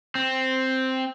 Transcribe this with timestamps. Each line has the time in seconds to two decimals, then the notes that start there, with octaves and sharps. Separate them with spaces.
0.15 C4